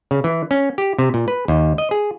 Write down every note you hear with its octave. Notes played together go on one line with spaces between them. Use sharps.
C#3
E3
C#4
G4
C3
A#2
B4
D#2
D#5
G#4